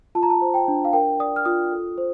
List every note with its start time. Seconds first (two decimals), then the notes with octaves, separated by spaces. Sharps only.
0.15 F4 A5
0.23 A#5
0.30 A5
0.42 C5
0.54 G5
0.68 D4
0.85 F5
0.93 A#4 G5
1.20 D5 D#6
1.36 F6
1.45 F4 D#6
1.72 A4
1.98 C5